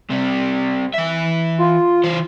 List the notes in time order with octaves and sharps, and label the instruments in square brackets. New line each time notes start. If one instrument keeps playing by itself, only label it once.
[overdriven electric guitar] C3 G3
E3 E5
[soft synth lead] F4
[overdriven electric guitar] E3 C5